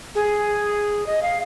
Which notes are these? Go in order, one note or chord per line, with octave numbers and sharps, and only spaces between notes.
G#4
D#5
F5